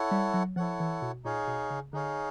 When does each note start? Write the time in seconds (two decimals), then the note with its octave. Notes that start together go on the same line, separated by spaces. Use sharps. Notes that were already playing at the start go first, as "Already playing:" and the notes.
Already playing: E4 A4 C#5 F#5
0.11 G3
0.34 F#3
0.56 F3 E4 A4 C#5 F#5
0.80 E3
1.02 B2
1.25 A#2 D#4 G#4 C#5 F5
1.47 B2
1.70 C#3
1.93 D3 D#4 G#4 C#5 F5